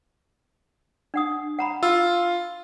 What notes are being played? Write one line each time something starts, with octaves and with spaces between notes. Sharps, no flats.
D4 F#5 D#6
F#5 A#5 B5
F4 E6